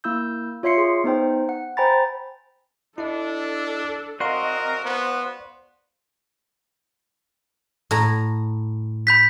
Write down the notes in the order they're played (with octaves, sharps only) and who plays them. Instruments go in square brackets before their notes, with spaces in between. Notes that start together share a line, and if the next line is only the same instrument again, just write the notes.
[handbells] A#3 E4 E6 G6
F4 C#5 E5 C6 C7 C#7
G#4
B3 D#4 C5 G5
F#5
C5 G5 G#5 A#5 B5 A6
[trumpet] D4 [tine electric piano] E4 D#5 [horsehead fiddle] A4
[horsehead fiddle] C4 D#5 [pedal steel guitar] F#4 C6 [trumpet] A#4 [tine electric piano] D5 F5 C#6
[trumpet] B3 [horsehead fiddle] C5
[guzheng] A2 A#5
[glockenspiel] B5 G6 B6